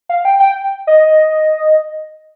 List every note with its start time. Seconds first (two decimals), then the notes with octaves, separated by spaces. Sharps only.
0.09 F5
0.25 G5
0.40 G5
0.87 D#5